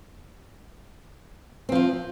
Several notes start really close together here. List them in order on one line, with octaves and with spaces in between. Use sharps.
C4 F3 F4